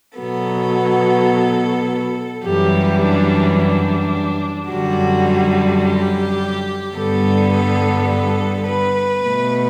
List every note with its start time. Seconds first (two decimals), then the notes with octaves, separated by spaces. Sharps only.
0.18 B2 F#3 B3 A4
2.44 F#2 E3 G3 G4
3.01 D4
3.58 D4
4.70 F#2 D3 G3 F#4
5.84 G4
6.97 G2 D3 G3 B3 A4
7.53 A4
8.10 A4
8.67 B4
9.23 B2 A3